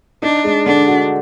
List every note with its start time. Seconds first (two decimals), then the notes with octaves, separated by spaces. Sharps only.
0.22 D4 D#4
0.44 G#3
0.66 D3 D4
0.87 F#4